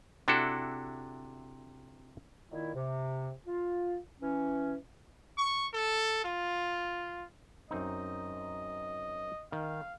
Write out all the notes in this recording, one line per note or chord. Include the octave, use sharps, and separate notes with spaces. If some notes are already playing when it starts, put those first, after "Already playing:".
C3 D4 E4 F#4 A4
A#2 D#3 E4
C3
F4
E3 C#4
C#6
A4
F4
F#2 C4 D#4 D#5
D#3 F5